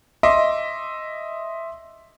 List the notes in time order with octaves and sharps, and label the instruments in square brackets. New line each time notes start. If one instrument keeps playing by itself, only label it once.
[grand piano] D#5 E5 C6 D6